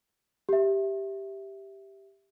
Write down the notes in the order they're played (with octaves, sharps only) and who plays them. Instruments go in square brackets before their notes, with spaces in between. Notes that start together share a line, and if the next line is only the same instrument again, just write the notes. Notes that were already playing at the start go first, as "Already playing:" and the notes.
[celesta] G4 E5